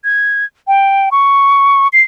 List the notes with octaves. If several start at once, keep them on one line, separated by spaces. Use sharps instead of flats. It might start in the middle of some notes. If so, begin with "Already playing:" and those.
G#6
G5
C#6
C7